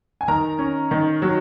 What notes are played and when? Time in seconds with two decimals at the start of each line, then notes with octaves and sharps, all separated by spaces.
0.21 G#5
0.28 D#3 A#4 A#5
0.59 C#4
0.91 D#3
1.22 F#3